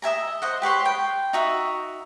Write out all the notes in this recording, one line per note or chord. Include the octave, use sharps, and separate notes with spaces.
D#5 E5 G#5 A#5
C5 D#5 F#5
G4 B4 C#5 C6
G5
D#4 F#4 E5